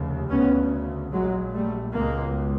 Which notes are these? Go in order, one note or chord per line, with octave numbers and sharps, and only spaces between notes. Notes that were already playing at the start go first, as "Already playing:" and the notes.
Already playing: F1 D#2 C#3
D2 C#3 B3 C#4
A#1 A#2 F#3 G#3
G3 A3
C#2 B2 G#3 A#3